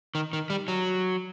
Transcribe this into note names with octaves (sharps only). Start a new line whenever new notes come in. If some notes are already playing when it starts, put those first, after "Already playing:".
D#3
D#3
G3
F#3